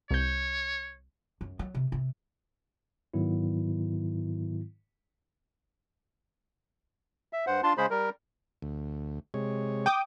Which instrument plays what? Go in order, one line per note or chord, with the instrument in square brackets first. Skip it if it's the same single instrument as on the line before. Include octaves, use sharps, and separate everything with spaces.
[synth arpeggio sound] C2 G6 [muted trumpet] C#5
[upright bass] F#2
F#3
C3
C3
[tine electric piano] G#2 D#3 F#3 B3 E4
[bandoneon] E5
G2 C5 F#5
D4 F4 A5 C6
C#3 G#3 G#4 C5 B5
G3 A#4
[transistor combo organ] D2
C3 G#3 C#5
[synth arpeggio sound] G5 D6 D#6